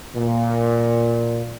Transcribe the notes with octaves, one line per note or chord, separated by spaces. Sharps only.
A#2